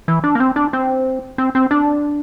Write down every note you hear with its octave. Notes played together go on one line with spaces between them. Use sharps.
E3
D4
A#3
C4
D4
C4
C4
C4
D4